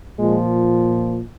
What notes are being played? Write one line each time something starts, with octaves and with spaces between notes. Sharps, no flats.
A#2 F3 G#3